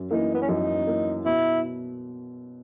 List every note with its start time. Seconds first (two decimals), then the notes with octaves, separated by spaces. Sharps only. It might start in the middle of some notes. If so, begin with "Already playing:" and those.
Already playing: F#2
0.11 E3 A#3 D#4
0.34 B3
0.42 C#4
0.49 F#2 D#4
0.87 E3 A#3
1.25 B2 E4